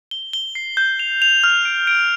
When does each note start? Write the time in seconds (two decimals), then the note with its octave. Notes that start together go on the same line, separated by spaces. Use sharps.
0.11 G7
0.33 G7
0.55 C7
0.77 G6
0.99 F7
1.22 F7
1.44 F6
1.65 D7
1.87 D7